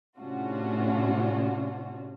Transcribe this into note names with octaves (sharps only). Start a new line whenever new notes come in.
A2 C3 C#4 D4 F4 F#4